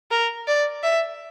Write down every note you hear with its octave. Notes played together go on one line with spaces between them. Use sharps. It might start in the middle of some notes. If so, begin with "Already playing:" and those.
A#4
D5
E5